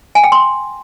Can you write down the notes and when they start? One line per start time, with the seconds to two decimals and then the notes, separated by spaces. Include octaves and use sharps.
0.15 G#5
0.24 G5
0.32 C6